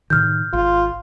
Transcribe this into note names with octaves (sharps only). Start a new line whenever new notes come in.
A2 C3 D#3 F6 G6
G#1 F4